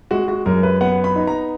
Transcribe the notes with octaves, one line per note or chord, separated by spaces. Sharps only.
G#3 F#4
F#4
F#2 A#4
B4
B3 F#5
B5
D#4
A#5